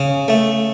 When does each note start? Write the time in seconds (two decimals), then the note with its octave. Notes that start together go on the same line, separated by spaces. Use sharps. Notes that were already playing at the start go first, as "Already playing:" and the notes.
Already playing: C#3
0.28 A3